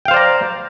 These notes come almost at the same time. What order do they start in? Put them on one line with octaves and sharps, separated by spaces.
G5 F5 C5 D5 A#5